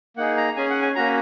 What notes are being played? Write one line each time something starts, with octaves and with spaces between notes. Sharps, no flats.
A#3 D#4 G#4 F#5
A#5
C#4 G#4 G#5
F#5
G#5
A#3 C#4 F#4 A#5